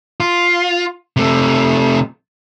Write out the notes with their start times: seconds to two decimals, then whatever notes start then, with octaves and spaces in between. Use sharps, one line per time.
0.20 F4
1.17 C3 A3